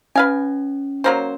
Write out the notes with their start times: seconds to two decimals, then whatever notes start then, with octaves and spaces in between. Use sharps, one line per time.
0.16 C#4 B4 F5 G#5
1.04 F#3 A#3 C5